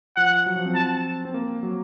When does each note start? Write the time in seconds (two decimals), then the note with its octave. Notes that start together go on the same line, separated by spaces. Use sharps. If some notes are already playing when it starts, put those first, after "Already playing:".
0.16 F3 F#5
0.46 F#3
0.56 F3
0.65 C4
0.75 A5
1.25 C4
1.34 A#3
1.63 F#3